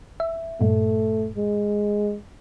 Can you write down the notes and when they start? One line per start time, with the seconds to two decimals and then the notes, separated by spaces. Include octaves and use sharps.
0.20 E5
0.61 G2 A#2 A3
1.37 G#3